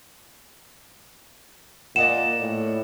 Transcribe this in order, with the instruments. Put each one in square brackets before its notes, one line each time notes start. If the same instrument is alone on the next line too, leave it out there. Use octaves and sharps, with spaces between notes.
[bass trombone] A#2 [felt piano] D5 D#5 F#5 [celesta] E7
[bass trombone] A2